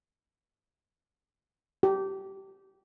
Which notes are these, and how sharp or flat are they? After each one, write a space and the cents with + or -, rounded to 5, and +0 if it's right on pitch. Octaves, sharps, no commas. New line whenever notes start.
G4 -20